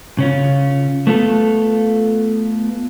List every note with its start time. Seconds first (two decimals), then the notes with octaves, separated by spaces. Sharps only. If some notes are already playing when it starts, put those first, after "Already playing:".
0.19 C#3 C#4 F4
1.07 A3 B3 F4 A4